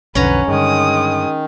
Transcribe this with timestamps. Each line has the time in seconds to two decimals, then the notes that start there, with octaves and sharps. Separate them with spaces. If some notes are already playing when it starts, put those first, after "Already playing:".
0.15 B1 F2 D3 C#4 B4 F#5 A#5
0.48 G2 D3 D#3 G#3 D#6